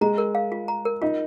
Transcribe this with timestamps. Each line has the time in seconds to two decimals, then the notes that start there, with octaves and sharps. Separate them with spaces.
0.01 G#3 A#5
0.18 A#4
0.35 F5
0.52 F4
0.68 A#5
0.85 A#4
1.02 D#4 F4